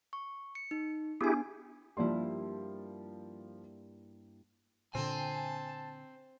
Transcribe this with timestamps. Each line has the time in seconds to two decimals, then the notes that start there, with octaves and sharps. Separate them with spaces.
0.13 C#6
0.55 C#7
0.71 D#4
1.21 B3 D4 E4 G4 G#4 G#5
1.97 G2 F3 A#3 E4 D5 C6
4.95 A#2 D3 C4 G#5 A5